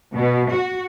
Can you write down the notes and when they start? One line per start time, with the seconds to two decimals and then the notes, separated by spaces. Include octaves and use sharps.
0.15 B2
0.51 F#4